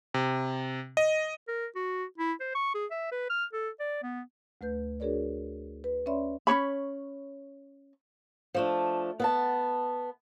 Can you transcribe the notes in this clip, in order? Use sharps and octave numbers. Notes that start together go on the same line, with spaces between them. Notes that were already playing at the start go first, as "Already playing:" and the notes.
C3
D#5
A#4
F#4
E4
C5
C#6
G#4
E5
B4
F6
A4
D5
B3
D2 A3 B4 G6
D4 F#4 G#4 A#4 C#5 D5
B4
C#4 C#5 D5 E5 B5 C6
C#4 D4 C#5 B5
F3 A3 D4
B3 F5 A5